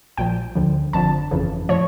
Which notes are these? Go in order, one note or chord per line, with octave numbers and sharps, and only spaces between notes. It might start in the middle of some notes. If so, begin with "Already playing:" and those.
A#1 A#2 F3 G5
D2 D3 F3
G1 F2 D3 F3 A5
G1 F2 C#3 E3
A2 F3 C#5